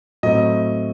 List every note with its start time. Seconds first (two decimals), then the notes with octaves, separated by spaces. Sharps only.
0.23 A2 F#3 A3 C4 D#5